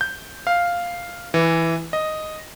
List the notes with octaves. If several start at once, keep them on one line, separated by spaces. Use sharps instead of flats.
G6
F5
E3
D#5